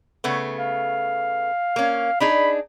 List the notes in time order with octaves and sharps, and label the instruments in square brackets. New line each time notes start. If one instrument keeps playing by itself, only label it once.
[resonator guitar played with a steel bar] C#3 A3 B3
[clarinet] F5
[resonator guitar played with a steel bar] A#3 C#4
[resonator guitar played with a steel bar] D4 D#4 G#4 [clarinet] B5